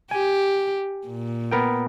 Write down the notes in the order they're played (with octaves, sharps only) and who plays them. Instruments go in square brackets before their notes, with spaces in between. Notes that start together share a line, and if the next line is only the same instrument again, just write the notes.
[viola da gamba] G4 [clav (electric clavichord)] G#5
[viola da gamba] A#2
[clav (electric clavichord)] B3 A#4 G5